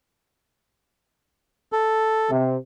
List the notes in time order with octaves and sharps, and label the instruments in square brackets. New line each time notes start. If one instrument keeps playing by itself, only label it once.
[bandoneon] A4
[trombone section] C3